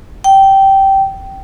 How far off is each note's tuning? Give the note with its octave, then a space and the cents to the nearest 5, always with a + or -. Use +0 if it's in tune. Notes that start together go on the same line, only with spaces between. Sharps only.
G5 -15